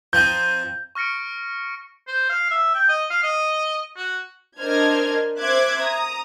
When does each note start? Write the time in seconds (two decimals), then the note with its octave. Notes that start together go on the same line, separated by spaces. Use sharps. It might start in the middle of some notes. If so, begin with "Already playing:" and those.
0.13 F3 C4 D#4 G6
0.95 C#6 F6 A#6 C#7 D7
2.07 C5
2.29 F5
2.50 E5
2.75 G5
2.89 D#5
3.10 F5
3.23 D#5
3.96 F#4
4.60 D4 A#4 C5 D#5 F6 G#6
5.40 C5 E5 D6 F#6 G#6
5.84 A#5 D#6